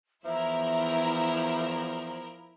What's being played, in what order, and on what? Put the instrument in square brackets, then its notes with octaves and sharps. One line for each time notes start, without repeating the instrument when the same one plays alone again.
[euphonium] E2 [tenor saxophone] F3 [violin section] E4 A#4 [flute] E5